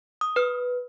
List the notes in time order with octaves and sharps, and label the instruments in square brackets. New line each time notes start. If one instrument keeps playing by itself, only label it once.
[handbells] D#6
B4 F6